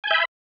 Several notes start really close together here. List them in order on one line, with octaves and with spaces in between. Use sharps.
G#5 G6 E5 B5